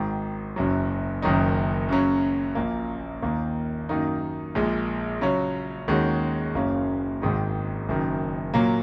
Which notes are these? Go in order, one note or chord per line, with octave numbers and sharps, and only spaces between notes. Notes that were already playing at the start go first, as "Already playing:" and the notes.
Already playing: G#1 G#2 D#3
F#1 F#2 F#3
F#1 F#2 D#3 F#3 D#4
F#2 C#3 F#3 C#4
A#1 A#2 A#3
D#2 D#3 A#3
F#2 D#3 A#3 D#4
A#1 A#2 G#3
C#3 F#3 C#4
D#2 D#3 G#3 C#4 F#4
F#1 F#2 C#3 A#3 C#4
G#1 G#2 D#3 G#3 D#4
F#1 F#2 D#3
A#2 F#3 A#3